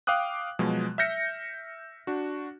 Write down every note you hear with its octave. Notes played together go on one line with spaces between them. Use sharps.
F5 G5 D6 D#6 F#6
B2 F3 F#3 G#3
E5 F6 G6 A#6 C#7
D4 F#4